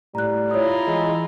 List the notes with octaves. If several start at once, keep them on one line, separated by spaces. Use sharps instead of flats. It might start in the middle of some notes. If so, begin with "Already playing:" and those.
A2 G3 A#5 F#6
E4 F4 C#5 A#5 D#6
E3 G#3